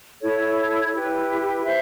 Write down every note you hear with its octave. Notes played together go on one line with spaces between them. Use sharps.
E4 A4 C#5
E4 G4 B4
C5 E5